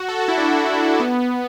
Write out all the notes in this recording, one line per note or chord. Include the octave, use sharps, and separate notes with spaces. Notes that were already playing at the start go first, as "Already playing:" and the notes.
Already playing: F#4
A4
F#4
E4
D4
B3